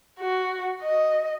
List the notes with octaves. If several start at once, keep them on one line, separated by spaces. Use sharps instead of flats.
F#4
D#5